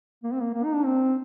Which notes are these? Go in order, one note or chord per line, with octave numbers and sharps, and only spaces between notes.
A#3
C4
A#3
A#3
D#4
D4
C4